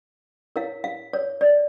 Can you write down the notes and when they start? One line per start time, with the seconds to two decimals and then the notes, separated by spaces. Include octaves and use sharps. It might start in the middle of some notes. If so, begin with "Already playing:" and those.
0.56 E4 A#4 C#5 F5
0.84 F5
1.13 C#5
1.41 D5